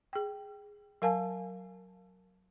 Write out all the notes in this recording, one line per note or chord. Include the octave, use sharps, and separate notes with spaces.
G#4 G5
F#3 A#4 F5 G#5 A5